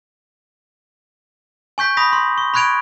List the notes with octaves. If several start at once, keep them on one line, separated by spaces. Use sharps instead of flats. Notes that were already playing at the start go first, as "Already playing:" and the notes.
G#5 C#6 G6 B6
B5 D#6 A#6 B6
C6
C#6
B5 C#6 F#6 G#6 D7 F7